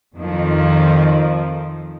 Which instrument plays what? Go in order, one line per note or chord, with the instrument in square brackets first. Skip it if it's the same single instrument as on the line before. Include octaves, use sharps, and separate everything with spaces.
[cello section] F2 D#3 F3